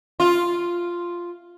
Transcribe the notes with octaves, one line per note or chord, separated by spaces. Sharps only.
F4